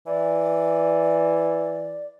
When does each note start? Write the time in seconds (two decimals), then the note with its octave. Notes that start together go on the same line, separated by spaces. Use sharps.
0.07 E3 D5